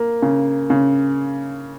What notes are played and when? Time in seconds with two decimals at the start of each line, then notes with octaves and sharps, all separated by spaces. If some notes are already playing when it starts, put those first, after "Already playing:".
Already playing: A#3
0.22 C#3
0.70 C#3